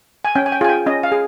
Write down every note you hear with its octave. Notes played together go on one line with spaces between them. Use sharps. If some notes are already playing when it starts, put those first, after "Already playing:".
G#5
C#4 G5
G#5
G5
F4 G#4 G#5
G5
C#4 D#5
F5
G#4